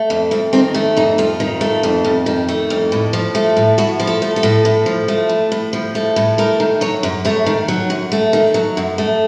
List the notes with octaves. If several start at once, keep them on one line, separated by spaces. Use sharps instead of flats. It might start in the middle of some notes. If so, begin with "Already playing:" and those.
Already playing: A3
F2
F2 C4
D#3 C4
A3 C#4
F2 D#4
F2 F4
D#3
A3
F2
F2
D#3
A3
F2
A2
F3
A3
A2
A2 F#4
F3
A4
A3
A4
A2
A2
F3
A3
A2
A2
F3
A3
A2
A3 A#4
D#3
F#3 C#5
F#2
A3 C#5
D#3
F#3
F#2
A3
D#3
F#3
F#2
A3